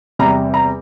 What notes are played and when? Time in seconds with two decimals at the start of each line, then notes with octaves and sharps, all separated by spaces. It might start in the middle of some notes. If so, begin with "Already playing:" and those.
0.19 E2 C3 G3 A#5
0.54 A#5